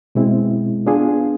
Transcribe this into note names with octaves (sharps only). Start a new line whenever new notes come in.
B2 G#3 C4 E4
B3 D4 F4 G#4